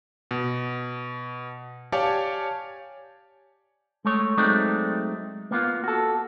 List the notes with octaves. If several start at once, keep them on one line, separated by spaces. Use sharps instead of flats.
B2
G4 C#5 D5 F5 G#5 A5
G#3 A3 C#5
F#3 G#3 A3 C4 D#4 D5
A#3 B3 F4
F#4 A4